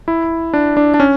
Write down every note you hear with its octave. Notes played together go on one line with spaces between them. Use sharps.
E4
D4
D4
D4
C#4